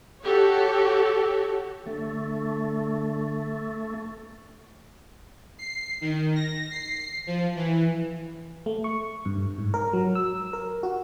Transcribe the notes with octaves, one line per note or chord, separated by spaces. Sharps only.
F#4 G4 A4 C#5
D3 A3
C7
D#3
A#6
C7
F3
E3
A3
C#6
G2
G#2
A#4
F#3
E6
A#4
F#4